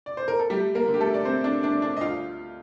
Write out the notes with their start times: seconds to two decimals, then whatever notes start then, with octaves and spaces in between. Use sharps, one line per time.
0.06 D5
0.17 C5
0.28 A#4
0.39 A4
0.50 G3 A3 G4
0.75 A#3 A#4
0.88 D3
0.94 G4
1.00 A3 A4
1.14 D5
1.25 A3 C4 C5
1.44 D4 D5
1.63 A3 D4 D5
1.82 D4 D5
1.97 D#5
2.01 D2 F4 F5